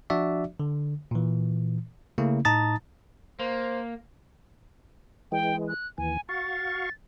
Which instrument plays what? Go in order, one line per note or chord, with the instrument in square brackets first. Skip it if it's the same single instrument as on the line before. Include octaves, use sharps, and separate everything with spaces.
[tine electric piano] F3 D4 F#4 D5 E5
D3
A#2 E3
C#3 A3 A#3 C#4 E4
A2 D#4 A5 A#5 D#6 A6
[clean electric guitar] A#3 [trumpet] C5
[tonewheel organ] E3 G#3 [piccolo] G5
[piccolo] F#6
[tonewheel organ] D#2 E3 [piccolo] G#5
[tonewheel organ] F#4 F5 C#6 [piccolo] A6